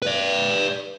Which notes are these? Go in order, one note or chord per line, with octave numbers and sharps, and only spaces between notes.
B4 D5